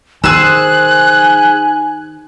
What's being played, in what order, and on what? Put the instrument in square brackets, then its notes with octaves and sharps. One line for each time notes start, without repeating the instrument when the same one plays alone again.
[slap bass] D#3 [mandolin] G#4 C5 E6 [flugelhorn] G#5 [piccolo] F#6